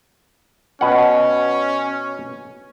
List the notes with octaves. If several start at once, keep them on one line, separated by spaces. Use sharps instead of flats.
B2 C#4 F#5